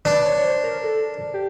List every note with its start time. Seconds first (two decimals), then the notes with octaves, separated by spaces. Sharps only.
0.05 D4 B4
0.25 C#5
0.38 C#5
0.45 C5
0.63 A#4
0.84 A4
1.34 G4